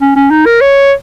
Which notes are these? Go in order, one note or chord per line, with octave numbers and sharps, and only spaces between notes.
C#4
C#4
D#4
A#4
C#5